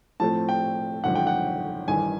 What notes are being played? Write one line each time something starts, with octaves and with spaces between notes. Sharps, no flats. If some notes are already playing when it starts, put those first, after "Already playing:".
A2 F3 A3 C4 A5
G5
G#1 F#2 D3 F3 F#5
G5
F#5
A1 G2 D#3 G#5